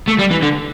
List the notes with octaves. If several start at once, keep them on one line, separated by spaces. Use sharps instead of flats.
A3
G3
E3
D3